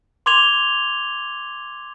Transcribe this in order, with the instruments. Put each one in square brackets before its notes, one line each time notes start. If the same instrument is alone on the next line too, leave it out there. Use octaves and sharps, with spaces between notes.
[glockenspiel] C6 D6 G#6 F7 G7